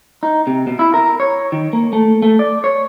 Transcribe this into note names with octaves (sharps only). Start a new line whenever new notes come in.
D#4
C3
B2
E4
A#4
C#5
D#3
A#3
A3
A3
D5
C#5